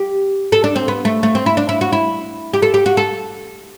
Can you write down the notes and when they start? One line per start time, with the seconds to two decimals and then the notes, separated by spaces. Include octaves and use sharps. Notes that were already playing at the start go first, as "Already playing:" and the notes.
Already playing: G4
0.52 A4
0.64 D4
0.76 C4
0.88 B3
1.05 A3
1.23 A3
1.35 C4
1.46 E4
1.57 D4
1.69 E4
1.81 F#4
1.93 E4
2.53 G4
2.62 A4
2.74 G4
2.86 F#4
2.97 A4